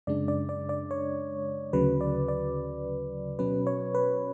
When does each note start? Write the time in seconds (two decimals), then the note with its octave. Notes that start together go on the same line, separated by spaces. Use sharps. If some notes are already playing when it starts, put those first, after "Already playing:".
0.07 F#2 C#3 G#3 D4 D5
0.28 D5
0.49 D5
0.69 D5
0.91 C#5
1.73 D2 C#3 F#3 B4
2.01 D5
2.28 D5
3.39 B2 F#3 C#4 B4
3.67 C#5
3.95 B4